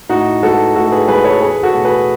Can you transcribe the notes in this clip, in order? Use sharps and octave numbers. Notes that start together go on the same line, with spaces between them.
A2 D#4 F#4
G#3 B3 F#4 A4
A2 F#4 A4
G#4 B4
G#3 B3 G#4 B4
A4 C#5
E2 G#4 B4
F#4 A4
B2 A3
G#4 B4